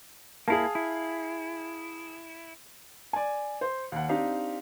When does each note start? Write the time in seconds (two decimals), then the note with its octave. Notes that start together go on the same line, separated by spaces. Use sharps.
0.48 A#3 E4 G#4 F5 A5
0.75 E4
3.13 D5 G#5
3.61 C5
3.92 D#2 F#5
4.09 C4 D4 D#4 G4 F5